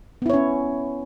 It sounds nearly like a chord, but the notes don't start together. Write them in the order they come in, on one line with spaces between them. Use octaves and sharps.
B3 E4 C#5 C#4